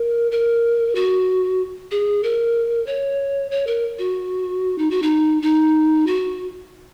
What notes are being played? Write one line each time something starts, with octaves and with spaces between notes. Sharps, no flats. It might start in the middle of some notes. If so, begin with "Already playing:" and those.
Already playing: A#4
A#4
F#4
G#4
A#4
C#5
C#5
A#4
F#4
D#4
F#4
D#4
D#4
F#4